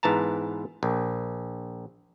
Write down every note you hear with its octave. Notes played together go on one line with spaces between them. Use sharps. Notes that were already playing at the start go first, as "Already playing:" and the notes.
G#2 E3 B3 A5 A#5
A#1